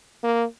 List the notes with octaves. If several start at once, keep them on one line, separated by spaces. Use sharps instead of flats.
A#3